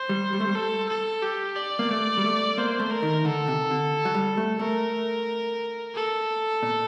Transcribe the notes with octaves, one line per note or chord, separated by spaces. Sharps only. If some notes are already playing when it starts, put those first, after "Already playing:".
Already playing: C5
G3
G3
A3
G3
A4
A4
G4
D5
A#3
A3
G3
A3
A#3 C5
A3
A#4
D#3
D3 A4
C3
D3
F#3
G3
A3
A3 A#4
A4
A#2